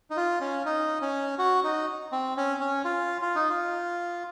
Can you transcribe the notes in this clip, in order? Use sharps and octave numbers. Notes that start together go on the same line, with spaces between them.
D#4
F4
C#4
D#4
C#4
F#4
D#4
C4
C#4
C#4
F4
F4
D#4
F4